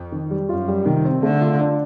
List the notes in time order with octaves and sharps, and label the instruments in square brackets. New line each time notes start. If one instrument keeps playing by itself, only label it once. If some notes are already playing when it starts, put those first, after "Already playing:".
Already playing: [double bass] F2
[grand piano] D#3
G3
[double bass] F#2 [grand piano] F4
[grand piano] G3
[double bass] C3 [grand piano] D#3
[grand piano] C4
[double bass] D3 [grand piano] A3
[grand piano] F4
D4